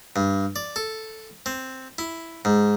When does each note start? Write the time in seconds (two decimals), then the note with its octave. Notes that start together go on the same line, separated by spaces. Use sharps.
0.16 G2
0.56 D5
0.76 A4
1.46 C4
1.98 E4
2.45 G#2